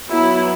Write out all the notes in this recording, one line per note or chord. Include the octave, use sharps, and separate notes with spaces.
F#3 B3 E4